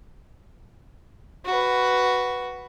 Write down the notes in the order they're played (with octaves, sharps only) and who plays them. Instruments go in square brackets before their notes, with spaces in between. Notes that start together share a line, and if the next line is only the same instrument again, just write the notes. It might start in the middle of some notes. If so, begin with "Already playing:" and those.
[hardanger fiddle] F#4 B4